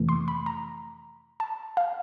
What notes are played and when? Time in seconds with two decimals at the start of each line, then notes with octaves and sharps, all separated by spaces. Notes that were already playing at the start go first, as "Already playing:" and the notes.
Already playing: F2 C3 E3 A3
0.09 C6
0.28 B5
0.46 A#5
1.40 A5
1.77 F5